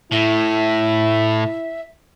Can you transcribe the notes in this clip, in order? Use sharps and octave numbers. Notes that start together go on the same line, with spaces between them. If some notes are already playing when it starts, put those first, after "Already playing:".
A2 E4 E5